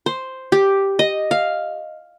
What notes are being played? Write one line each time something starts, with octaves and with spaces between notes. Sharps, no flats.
C5
G4
D#5
F5